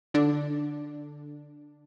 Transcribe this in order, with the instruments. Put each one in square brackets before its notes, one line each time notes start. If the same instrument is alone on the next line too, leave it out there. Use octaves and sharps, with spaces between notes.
[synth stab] D3 D4